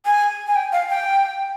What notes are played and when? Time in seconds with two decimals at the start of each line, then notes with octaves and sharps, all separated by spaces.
0.06 G#5
0.47 G#5
0.56 G5
0.72 F5
0.90 G5